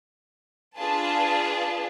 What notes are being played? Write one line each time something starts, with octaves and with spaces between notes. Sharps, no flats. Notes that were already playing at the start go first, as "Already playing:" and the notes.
D4 F4 G#4 B4 A5